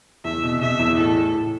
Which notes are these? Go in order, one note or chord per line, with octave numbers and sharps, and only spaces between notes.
E2 E5
B2
B2 E5
E2
A2 A4
A2
A2